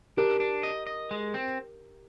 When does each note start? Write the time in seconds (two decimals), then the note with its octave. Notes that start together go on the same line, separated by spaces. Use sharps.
0.17 D4 G4 A#4
0.40 D4
0.63 D#5
0.87 D#5
1.11 G#3
1.34 C4